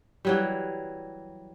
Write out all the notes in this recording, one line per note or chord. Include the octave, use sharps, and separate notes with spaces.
E3 F#3 G3